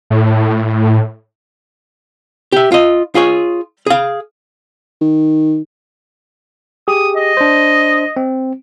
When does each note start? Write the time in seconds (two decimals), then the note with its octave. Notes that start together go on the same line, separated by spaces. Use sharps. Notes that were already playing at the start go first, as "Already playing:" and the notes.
0.10 A2
2.52 G4 E5
2.72 F4 D#5
3.15 F4 G#4 C#5
3.86 G#4 F5
5.01 D#3
6.88 G4 G#4 D#6
7.16 D#5
7.37 D4 C5
8.17 C4